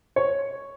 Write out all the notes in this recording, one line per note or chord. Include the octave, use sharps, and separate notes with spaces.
C#5